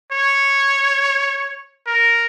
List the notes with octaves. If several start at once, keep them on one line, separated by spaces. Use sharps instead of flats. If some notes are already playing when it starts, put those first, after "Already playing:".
C#5
A#4